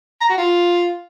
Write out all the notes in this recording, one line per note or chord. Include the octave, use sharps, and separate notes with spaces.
A#5
F#4
F4